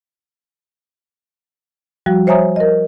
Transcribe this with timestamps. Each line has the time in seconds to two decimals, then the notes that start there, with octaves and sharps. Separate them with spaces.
2.06 F3 G3 F#4
2.27 C5 C#5 E5 G#5 A#5 D#6
2.56 A#4 D#5